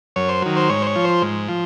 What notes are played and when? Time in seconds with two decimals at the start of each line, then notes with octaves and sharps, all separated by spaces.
0.16 F#2 C#5
0.29 C5
0.42 D#3 F#3
0.56 C5
0.69 G#2 C#5
0.82 C5
0.87 C#5
0.96 F3
1.04 C5
1.22 G#2
1.49 F3